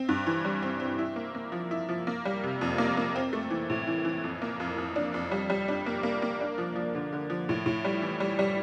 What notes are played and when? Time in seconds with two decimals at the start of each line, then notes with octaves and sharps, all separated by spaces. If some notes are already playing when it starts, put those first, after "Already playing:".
Already playing: C4
0.09 G2
0.26 E3
0.45 G3
0.62 C4
0.80 C4
0.99 E4
1.16 A#3
1.35 A#3
1.52 F3
1.71 E4
1.89 F3
2.07 A#3
2.25 G3
2.43 C3
2.61 F2
2.78 A#3
2.97 A#3
3.16 C4
3.33 A3
3.50 E3
3.70 A2
3.87 E3
4.05 E3
4.24 F2
4.42 A#3
4.60 F2
4.78 F2
4.96 D4
5.14 F2
5.31 G3
5.50 G3
5.68 D4
5.86 A#3
6.03 A#3
6.22 A#3
6.41 D4
6.58 F3
6.75 F3
6.95 D3
7.13 D3
7.30 F3
7.49 A2
7.66 A2
7.85 G3
8.02 E3
8.20 G3
8.39 G3